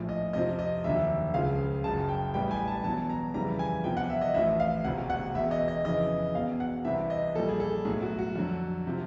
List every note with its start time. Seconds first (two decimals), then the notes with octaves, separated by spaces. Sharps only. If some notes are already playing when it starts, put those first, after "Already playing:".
Already playing: A#1 A2 F3
0.09 D#5
0.33 F2 C3 F3 D#5
0.59 D#5
0.84 F1 D#2 D3 F#3 E5
1.34 C#2 C#3 F3 F5
1.84 F#1 F#2 C#3 A5
2.09 G5
2.34 A1 A2 E3 G3 G5
2.51 G#5
2.67 A5
2.84 E2 B2 F#3 A5
3.10 A#5
3.34 F2 C#3 E3 G3 A#5
3.59 G#5
3.84 E2 C3 F3 G5
3.97 F#5
4.10 E5
4.21 D#5
4.34 A1 A2 F3 E5
4.60 F5
4.84 E1 D2 C3 F#5
5.10 F#5
5.34 E1 E2 B2 E5
5.51 D#5
5.68 D#5
5.85 F2 C#3 E3 D#5
6.35 E1 E2 B2 F5
6.60 F#5
6.85 C2 C3 E3 E5
7.10 D#5
7.35 A#1 A#2 G3 A4
7.49 G#4
7.60 A4
7.85 B1 A2 F#3 G#4
8.02 F#4
8.19 F#4
8.35 F2 D3 F#3
8.87 C3 F3